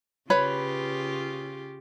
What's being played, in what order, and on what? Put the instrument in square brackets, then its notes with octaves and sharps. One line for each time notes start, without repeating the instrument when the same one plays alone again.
[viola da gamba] C#3 F4 G4 [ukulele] B4 C#5 B5